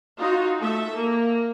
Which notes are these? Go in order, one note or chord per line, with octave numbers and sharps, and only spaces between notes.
D#4 F4 F#4
A3 A4 E5
A#3